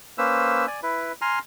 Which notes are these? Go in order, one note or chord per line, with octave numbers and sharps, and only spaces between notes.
A#3 C#4 B4 C5 E6
D5 G#5
E4 B4
G#5 A#5 C6 F6